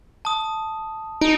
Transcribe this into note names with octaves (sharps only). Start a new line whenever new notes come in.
A5 D#6
D#4 D7